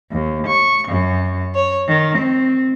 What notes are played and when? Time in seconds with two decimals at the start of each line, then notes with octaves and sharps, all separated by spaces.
0.11 D#2
0.47 C#6
0.89 F#2
1.56 C#5
1.88 D#3
2.17 C4